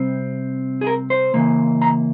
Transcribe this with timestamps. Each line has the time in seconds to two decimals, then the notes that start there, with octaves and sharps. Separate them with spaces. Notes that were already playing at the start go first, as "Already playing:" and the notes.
Already playing: C3 G3 C4
0.81 G#4
0.87 A#4
1.10 C5
1.34 C#3 E3 A#3
1.82 A#5